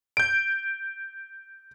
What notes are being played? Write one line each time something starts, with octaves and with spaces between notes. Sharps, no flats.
G6 D7